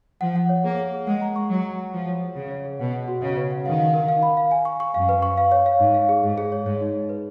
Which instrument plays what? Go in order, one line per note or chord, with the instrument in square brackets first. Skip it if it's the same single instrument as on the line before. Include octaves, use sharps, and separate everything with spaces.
[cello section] F3 [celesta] F#5
[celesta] F#5
C#5
[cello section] A#3 [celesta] G#4
[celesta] G#4
G#4
[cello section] G#3 [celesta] F#5
[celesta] A#5
C#6
[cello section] F#3 [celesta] A#5
[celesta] F#5
F#5
[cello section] F3 [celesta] F#5
[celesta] C#5
G#4
[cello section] C#3 [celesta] G#4
[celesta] C#5
G#4
[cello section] B2 [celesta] F#5
[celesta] F#5
F#4
[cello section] C#3 [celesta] D#5
[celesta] B4
F#5
[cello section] D#3 [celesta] F5
[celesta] F5
A#4
F5
B5
F5
G#5
C#6
C#6
[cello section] F#2 [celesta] F5
[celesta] B4
C#6
F5
C#5
F5
[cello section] G#2 [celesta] D#4
[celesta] F5
G#4
[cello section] G#2 [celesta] G#4
[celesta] G#4
C#5
[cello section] G#2 [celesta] C#5
[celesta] D#4
D#4
B4